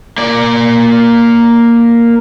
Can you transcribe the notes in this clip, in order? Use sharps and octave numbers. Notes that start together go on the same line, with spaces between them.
A#3 D5